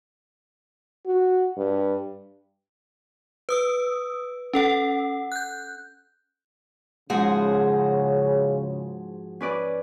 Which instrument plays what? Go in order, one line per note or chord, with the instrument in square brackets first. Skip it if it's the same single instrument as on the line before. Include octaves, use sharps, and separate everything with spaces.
[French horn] F#4
G2
[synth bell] B4 D#6 E6
C#4 A4 F#5
F#6 G6
[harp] G#2 F3 [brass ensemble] C#3 [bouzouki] F#4 G#4
[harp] C#4 B4 D5